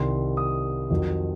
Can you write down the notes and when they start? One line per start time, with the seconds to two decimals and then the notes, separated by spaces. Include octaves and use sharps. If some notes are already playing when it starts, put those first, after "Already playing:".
Already playing: C2 C3 D#3 C6
0.37 D#6
0.90 F2 D#3 F#3